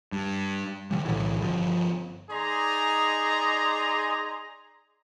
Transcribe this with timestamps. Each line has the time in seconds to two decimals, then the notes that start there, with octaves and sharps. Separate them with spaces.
0.12 G2
0.90 D#3 E3 G3
1.05 B1 A2 D3 E3
1.40 G1 F3
2.29 D#4 G#4 D5 G#5 A#5 C6